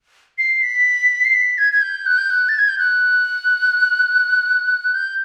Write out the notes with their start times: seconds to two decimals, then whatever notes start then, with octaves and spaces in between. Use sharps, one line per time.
0.38 C7
0.62 B6
1.25 C7
1.34 B6
1.58 G#6
1.73 G#6
1.82 G6
2.06 F#6
2.18 G6
2.30 F#6
2.49 A6
2.59 G#6
2.68 G6
2.79 F#6
4.94 G6